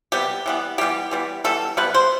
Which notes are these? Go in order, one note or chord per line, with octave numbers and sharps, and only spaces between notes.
C3 G3 B3 G4
E3 G3 B3
E3 G3 B3 G4
E3 G3 B3
E3 G3 B3 A4
C3 G3 B3 B4
C5